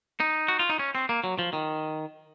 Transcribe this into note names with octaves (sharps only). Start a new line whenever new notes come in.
D#4
F#4
F4
D#4
C#4
C4
A#3
F#3
F3
D#3